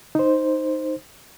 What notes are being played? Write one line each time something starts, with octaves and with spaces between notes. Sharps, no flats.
D#4 C5